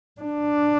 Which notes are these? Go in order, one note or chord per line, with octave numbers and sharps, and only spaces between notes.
D4